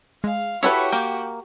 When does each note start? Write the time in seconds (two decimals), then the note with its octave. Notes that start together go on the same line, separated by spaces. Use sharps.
0.24 G#3 F5
0.63 E4 F#4 G4 A4 B4 C#5
0.92 A#3 G5